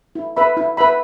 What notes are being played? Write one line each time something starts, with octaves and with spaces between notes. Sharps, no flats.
E4
B4 E5 B5
E4
B4 E5 B5